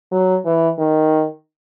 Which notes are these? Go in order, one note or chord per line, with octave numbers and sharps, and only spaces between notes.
F#3
E3
D#3